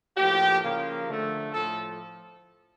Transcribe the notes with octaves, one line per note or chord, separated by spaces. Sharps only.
A2 F3 A#3 G4
C#3 F3 A#3
D3 F3 A3
A2 F3 A4